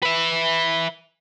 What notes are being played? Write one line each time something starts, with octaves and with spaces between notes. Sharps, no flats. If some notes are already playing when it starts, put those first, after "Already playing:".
B4 E5